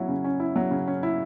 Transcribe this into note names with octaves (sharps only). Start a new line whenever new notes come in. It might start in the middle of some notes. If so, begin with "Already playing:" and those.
Already playing: F#3 C#4 E4
C#3
C#4
E4
F#3
C#3
C#4
E4